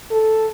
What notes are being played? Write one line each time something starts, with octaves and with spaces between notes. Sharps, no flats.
A4